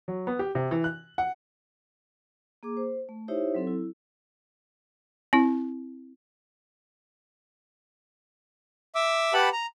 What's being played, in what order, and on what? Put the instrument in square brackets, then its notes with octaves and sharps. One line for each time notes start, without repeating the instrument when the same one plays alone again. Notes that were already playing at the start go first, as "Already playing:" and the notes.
[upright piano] F#3
B3
G4
C3
E3
F#6
F#5
[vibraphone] A#3 G#4 D6
C5
A3
D#4 E4 G4 C5 C#5 E5
F#3 C4 A4
E4
[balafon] C4 E4
[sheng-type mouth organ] E5 D6 E6
G4 B4 F#5 A5 B5
A#5